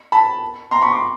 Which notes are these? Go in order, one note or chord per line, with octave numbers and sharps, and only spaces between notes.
A5 B5
A#5 C6
B5 C#6
C6 D6